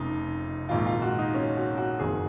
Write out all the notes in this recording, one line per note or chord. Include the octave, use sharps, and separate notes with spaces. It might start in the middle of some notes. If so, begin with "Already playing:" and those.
Already playing: F1 F2 C#3 D#4
A#1 G#2 D#3 F4
F4
F#4
D#4
C#4
F#4
F#4
F#1 F2 D#3 G#4